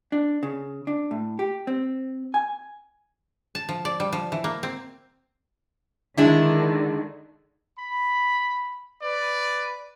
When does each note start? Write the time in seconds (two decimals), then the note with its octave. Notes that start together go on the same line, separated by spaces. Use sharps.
0.12 D4
0.43 C#3
0.87 D4
1.11 A2
1.39 G4
1.67 C4
2.34 G#5
3.55 A5
3.69 F3
3.85 D5
4.00 G3
4.13 F3
4.32 E3
4.44 A#3
4.63 C4
6.17 D3 D#3 G#3 D4 E4
7.79 B5
9.01 B4 D5